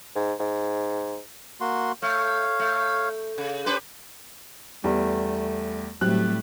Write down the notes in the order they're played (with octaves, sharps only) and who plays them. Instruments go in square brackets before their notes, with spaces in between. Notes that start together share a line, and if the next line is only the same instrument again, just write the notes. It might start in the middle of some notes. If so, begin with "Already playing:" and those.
[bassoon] G#2
G#2
[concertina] A#3 F#4 C6
[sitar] A3 [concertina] C#5 F5
[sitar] A3
C#3
[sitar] C#4 G4 B4 [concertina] C5
[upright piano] E2 G3 [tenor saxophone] A3
[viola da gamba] A2 G3 A3 [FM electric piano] F#3 C4 G4 [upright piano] F#6